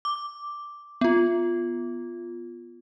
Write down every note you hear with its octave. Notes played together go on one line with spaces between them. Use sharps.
D6
B3 F4